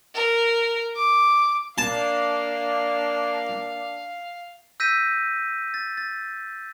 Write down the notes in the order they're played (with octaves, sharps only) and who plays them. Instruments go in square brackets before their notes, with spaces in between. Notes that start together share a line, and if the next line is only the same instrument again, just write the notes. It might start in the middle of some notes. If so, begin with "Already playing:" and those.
[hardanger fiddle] A#4
D6
[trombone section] A#3 D4 [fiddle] F5 [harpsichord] A5
[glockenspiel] E6 G6 A#6 B6 D#7
A6
A6